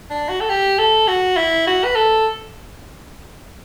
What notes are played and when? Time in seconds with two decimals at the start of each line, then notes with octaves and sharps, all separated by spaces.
0.10 D4
0.29 F#4
0.40 A4
0.50 G4
0.79 A4
1.08 F#4
1.37 E4
1.67 F#4
1.84 B4
1.96 A4